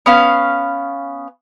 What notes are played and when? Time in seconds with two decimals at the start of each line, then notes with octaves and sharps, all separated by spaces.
0.06 B3 C#4 F5